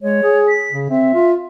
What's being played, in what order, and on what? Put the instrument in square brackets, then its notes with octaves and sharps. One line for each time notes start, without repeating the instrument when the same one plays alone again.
[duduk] G#3 [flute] C#5
[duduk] G#4
[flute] B6
[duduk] C#3
[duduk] C4 [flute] E5
[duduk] F4